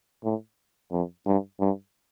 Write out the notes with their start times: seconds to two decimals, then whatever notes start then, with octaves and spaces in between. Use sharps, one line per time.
0.24 A2
0.92 F2
1.26 G2
1.60 G2